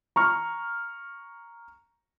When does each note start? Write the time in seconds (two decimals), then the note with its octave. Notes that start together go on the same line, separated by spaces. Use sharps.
0.16 A#5 C#6 F6